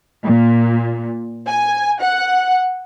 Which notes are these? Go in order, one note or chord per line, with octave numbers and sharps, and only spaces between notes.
A#2
G#5
F#5